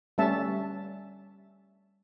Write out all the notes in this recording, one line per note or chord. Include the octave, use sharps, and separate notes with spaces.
G3 A3 C#4 E5 A5